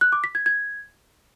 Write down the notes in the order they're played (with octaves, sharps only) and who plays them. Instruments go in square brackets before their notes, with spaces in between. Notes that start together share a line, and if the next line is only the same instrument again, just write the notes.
[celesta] F#6
D6
B6
G#6
G#6